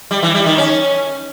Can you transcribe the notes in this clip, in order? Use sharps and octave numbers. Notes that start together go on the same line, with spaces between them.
G3
E3
G3
D#3
C#4